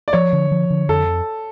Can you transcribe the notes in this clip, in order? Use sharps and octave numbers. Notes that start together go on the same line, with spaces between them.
D5
F3 C#5
D3
F3
D3
F2 A4